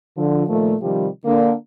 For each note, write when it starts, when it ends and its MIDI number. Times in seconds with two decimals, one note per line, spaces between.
0.17 0.47 50
0.17 0.47 53
0.47 0.75 46
0.47 0.75 51
0.47 0.75 53
0.47 0.75 57
0.81 1.07 48
0.81 1.07 51
0.81 1.07 53
0.81 1.07 55
1.24 1.53 50
1.24 1.53 58